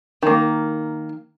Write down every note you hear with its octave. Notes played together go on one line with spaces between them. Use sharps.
D#3 A#3